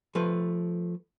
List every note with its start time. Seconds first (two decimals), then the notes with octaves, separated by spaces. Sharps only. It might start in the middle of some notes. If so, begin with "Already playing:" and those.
0.15 F3 A3 B4